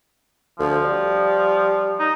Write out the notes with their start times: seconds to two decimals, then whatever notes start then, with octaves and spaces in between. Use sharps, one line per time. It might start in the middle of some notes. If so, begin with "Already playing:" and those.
0.59 D2 F3
0.85 G3
1.99 D#4